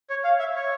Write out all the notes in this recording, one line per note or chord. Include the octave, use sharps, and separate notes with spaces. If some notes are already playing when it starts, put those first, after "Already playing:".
C#5
F5
E5
C#5